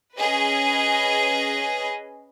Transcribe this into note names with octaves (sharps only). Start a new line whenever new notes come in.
C#4 G#4 B4 D#5